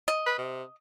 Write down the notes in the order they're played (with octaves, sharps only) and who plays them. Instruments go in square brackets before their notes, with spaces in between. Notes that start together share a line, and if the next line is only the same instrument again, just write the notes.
[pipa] D#5
[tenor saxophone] B4
C3